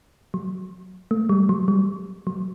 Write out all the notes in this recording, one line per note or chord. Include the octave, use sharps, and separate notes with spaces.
F#3
A3
G3
F#3
G3
F#3